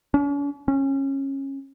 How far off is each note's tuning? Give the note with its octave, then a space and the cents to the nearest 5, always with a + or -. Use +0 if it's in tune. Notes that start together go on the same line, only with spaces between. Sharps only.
C#4 +45
C#4 -20